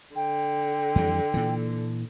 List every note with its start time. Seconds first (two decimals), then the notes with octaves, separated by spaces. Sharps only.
0.16 D3 G5
0.95 F2 E3 G3
1.34 A#2 E3